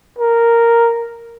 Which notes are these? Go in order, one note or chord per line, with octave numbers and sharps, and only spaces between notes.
A#4